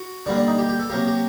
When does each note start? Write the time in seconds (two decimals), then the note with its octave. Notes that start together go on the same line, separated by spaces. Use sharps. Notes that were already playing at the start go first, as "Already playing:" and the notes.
Already playing: F#4
0.26 D3 G3 A#3 D4
0.37 D4
0.47 D#4
0.58 G4
0.69 G4
0.79 A4
0.89 C3 F#3 A#3 G4
1.07 G4